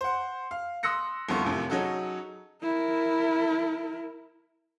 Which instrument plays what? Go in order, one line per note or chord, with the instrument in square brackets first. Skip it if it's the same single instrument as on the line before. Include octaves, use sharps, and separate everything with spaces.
[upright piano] C5 F#5
F5
C6 D#6 E6 F#6 A#6 C#7
C2 F2 D3 B3 F4 C#6
F#2 A2 C3 F3
F#3 C#4 D#4 F#4 G#4 A4
[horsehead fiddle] E4 A#4